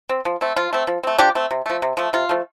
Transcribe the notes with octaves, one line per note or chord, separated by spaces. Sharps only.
C4
F3
A3 C4
F3 F4
A3 C4
F3
A3 C4
F3 D4 G4
A3 C4
C3
F3 A3
C3
F3 A3
C3 F4
F3 A3